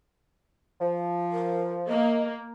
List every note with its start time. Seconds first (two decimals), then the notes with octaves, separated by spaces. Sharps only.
0.81 F3
1.32 A#4
1.88 A#3 D#5